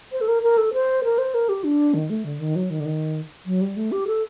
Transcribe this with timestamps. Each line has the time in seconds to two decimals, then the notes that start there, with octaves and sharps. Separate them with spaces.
0.12 C5
0.21 A4
0.28 A#4
0.43 A#4
0.58 A4
0.74 C5
1.04 A#4
1.18 C5
1.34 A#4
1.49 G4
1.64 D4
1.94 D#3
2.10 A3
2.25 D3
2.39 D#3
2.56 F#3
2.70 D#3
2.80 D3
2.85 D#3
3.46 F#3
3.61 G3
3.76 A3
3.92 G4
4.07 A4